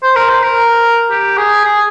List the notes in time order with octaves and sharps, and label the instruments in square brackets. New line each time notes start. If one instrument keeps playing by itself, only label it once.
[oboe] C5
A#4
C5
A#4
G4
G#4
G#4